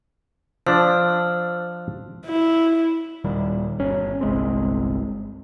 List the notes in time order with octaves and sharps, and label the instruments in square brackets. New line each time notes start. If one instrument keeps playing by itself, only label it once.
[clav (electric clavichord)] F3 D4 [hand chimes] C5 E6 F6
[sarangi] E4
[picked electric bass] D#1 A#2 D#3 G3
G1 C#4
G1 C2 G#3 C4